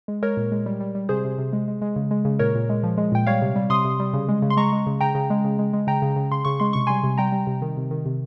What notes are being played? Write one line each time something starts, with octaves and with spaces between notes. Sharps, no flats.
G#3
G#3 A#4 C#5
A#2
G#3
G3
G3
G3
C3 G#4 C5
C3
C3
G#3
G#3
G#3
C#3
G#3
C#3
A#2 A#4 C#5
A#2
G#3
F3
G#3
A#2 G5
G3 C#5 F5
C3
G3
C3 C6 D#6
C3
G3
C#3
G#3
C#3
C6
G#3 A#5 C#6
G#3
C#3
C#3 G5 A#5
C#3
G#3
C#3
G#3
G#3
C#3 G5 A#5
C#3
C#3
C#3 C6
C#3 C#6
G#3 C6
C3 C#6
G3 G#5 C6
C3
G3 G5 A#5
G3
C3
D#3
C3
D#3
C3